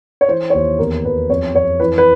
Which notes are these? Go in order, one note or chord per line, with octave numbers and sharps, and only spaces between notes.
C#5
E3 C5
C#5
D#2 C5
E2 A#4
E2 B4
F2 C#5
F2 C#5
E3 B4
B4